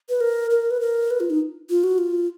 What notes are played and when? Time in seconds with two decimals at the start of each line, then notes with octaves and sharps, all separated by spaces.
0.09 B4
0.21 A#4
0.51 A#4
0.71 B4
0.81 A#4
1.11 B4
1.20 F4
1.30 D#4
1.70 F4
1.84 F#4
1.98 F4